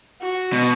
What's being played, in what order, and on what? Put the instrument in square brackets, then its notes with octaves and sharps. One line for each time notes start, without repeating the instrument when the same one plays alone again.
[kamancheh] F#4
[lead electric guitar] B2